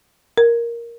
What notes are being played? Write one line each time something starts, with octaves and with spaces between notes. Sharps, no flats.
A#4